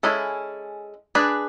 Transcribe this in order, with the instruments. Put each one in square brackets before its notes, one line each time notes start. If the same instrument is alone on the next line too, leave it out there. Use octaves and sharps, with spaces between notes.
[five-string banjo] G#3 C#4 E4 A4
D4 G#4 B4 D5